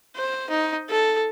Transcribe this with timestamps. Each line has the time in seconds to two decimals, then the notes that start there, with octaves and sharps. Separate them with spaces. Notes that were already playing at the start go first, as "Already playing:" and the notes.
0.16 C5
0.50 D#4
0.90 A4